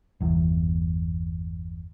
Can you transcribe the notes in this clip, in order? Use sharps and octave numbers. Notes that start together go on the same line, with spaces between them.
G1 E2